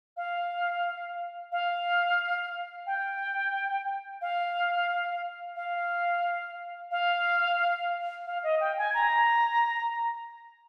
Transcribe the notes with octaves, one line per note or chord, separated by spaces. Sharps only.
F5
F5
G5
F5
F5
F5
F5
D#5
G5
G#5
A#5